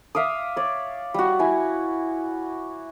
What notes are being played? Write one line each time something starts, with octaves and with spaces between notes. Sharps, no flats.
E5 F5 D6 D#6
C#5 D5
G3 F#4
E4 G#5